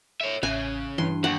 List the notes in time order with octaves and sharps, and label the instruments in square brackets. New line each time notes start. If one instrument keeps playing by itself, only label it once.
[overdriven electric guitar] C#5 E5
[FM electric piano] A1 E5 F#6 [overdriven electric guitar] C#3 [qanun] G#5
[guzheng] G2 [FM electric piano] E3 [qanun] C6
[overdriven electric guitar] D#2 [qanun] F#5